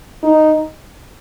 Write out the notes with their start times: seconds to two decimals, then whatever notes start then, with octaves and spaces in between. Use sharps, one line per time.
0.23 D#4